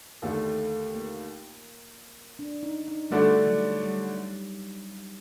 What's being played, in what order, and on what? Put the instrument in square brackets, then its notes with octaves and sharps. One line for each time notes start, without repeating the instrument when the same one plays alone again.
[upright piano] D#2 D3 A3
[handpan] A#3
D4
D#4
D#4
[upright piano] D3 A3 D4 F#4 [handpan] G3
[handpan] F#3
G3